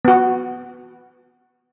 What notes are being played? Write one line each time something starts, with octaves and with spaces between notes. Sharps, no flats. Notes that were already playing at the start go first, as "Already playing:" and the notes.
B3 F#4